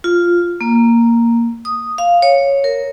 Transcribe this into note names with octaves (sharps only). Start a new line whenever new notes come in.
F4
A#3
D#6
F5
C#5
A#4